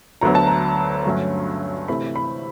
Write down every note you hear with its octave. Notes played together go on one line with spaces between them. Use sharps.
D2 D3 F#3 B3 A#5
A5
A#5
G2 D3 F#3 A3 C#4
C3 E3 A3 B5
B5